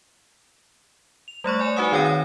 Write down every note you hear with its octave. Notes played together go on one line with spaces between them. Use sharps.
F7
G3 A3 C#5 C#6
D5 G#5 E7
D#4 F#4 B4 F#5 G#5 D#6
D#3 C4 C#5 G5 A#6 D#7